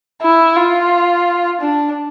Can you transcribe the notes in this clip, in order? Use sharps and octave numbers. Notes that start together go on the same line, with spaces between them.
E4
F4
D4